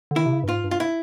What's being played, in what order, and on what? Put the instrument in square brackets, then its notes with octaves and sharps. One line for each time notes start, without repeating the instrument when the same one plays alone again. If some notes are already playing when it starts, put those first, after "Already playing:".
[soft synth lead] D3
[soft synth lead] D#3 [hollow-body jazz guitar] E4
[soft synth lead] C3
C#3
G2
[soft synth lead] G#2 [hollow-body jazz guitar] F4
[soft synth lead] G2
[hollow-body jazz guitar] F4
E4